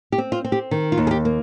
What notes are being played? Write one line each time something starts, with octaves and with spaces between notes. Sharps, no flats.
G4
C4
F4
C4
G4
D#3
F4
D#2
G#4
G4
A#3